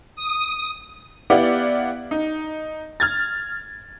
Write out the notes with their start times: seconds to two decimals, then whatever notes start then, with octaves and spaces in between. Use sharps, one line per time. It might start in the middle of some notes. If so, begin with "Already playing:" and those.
0.16 D#6
1.30 B3 E4 G4 D5 F5 F#5
2.11 D#4
3.00 F6 G#6 A6